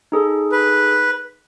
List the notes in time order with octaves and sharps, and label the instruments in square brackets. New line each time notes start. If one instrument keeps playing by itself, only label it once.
[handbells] D#4 G#4 A4
[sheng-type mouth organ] B4